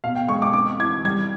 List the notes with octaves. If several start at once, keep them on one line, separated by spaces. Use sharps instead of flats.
B2 F5
G5
G#3 C#6
D6
C4 D6
E3 G#6
G3 G#6